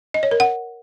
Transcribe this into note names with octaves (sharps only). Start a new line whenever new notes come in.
D#5
C#5
A#4
F#5